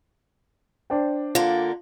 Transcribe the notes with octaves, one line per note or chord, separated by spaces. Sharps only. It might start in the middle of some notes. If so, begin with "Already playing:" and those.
D4 C5 G5
D3 A#3 F4